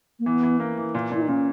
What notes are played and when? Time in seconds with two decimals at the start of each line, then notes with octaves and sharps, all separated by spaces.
0.19 A#3
0.25 E3 B3
0.43 E3
0.60 A#3
0.78 E3
0.95 A#2
1.12 A#2 E4
1.22 D#4
1.28 A#2 C#4